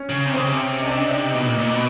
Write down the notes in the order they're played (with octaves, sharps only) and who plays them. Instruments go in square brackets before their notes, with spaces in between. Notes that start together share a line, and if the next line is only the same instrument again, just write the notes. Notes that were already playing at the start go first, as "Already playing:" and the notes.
Already playing: [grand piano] C#4 C#5
[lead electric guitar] C#3
C3
[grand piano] C5
[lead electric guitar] C#3 [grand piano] C#4 C#5
[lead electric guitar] C3
[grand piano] D#5
D4 D5
D5
D#4 D#5
[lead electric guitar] B2
A#2
A#2
B2